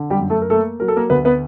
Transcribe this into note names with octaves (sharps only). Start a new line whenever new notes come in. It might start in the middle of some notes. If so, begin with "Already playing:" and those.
Already playing: D3
G3 G4
F#2
A3 A4
A#4
A3 A#3 A4
F#3 A#4
A4
A#3 A#4
D2 B3 B4
B3 B4